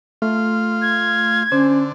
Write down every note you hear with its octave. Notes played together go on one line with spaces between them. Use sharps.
A3 F4
G#6
D3 C#4 C5